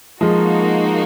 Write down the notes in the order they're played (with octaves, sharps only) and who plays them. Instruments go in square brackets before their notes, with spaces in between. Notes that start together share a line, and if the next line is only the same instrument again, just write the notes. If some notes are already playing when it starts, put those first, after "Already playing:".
[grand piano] F3 G#3 [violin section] A#3 D#4 F#4